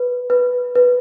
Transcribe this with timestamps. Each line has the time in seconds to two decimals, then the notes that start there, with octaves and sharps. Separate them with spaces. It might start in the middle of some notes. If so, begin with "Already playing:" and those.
Already playing: B4
0.30 B4
0.75 B4